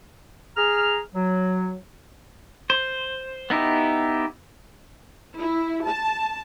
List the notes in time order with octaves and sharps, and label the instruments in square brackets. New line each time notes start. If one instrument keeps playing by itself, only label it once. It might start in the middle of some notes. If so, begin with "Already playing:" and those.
[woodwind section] G#4 A#5 F6
F#3
[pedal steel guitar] C5
B3 D#4 E4 G4
[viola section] E4
A5